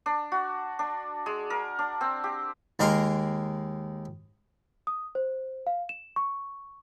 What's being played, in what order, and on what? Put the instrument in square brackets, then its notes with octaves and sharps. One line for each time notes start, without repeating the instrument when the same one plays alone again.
[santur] D4
F#4
D4
G#3
A#4
D4
C4
G4
[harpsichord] D#2 G#3 A#4 D#5 A#5 C6
[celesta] D#6
C5
F5
E7
C#6